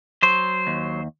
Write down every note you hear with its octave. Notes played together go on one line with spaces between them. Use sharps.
F#3 C5
D#2